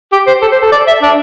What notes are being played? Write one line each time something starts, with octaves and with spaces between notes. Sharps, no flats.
G4
C5
A4
C5
A4
D5
E5
D4